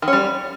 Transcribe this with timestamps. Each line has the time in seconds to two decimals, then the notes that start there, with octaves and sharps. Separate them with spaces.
0.02 D#3
0.08 C#4
0.13 G3